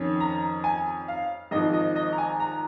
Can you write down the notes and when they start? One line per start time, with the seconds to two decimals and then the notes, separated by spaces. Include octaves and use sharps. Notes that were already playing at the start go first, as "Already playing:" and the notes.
Already playing: F2 D#3 C#4
0.20 A#5
0.64 G#5
1.08 F5
1.51 G#1 G#2 F3 D#5
1.73 D#5
1.95 D#5
2.13 A#5
2.18 G#5
2.40 A#5